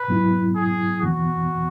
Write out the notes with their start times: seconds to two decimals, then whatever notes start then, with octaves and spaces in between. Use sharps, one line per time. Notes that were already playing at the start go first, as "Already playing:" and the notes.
Already playing: B4
0.08 G#2 F#3 B3 E4
0.56 G#4
1.01 E2 E3 B3 F#4